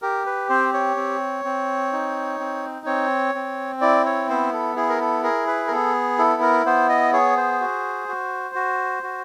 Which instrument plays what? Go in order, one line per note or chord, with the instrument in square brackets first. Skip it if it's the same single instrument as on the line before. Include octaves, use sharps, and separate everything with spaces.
[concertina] G4 A#4
B4
C4 C5
C#5
C4
C4
D#4
C4
C4 C#5
C4
E4 D5
C#5
B3 C5
A4
E4 G#4
A#4
A4
G#4 A#4
B4
A#4
B3 A4
E4 A4
A#4
B3 C5
D#5
G#4 C#5
C5
F#4
F#4
F#4
F#4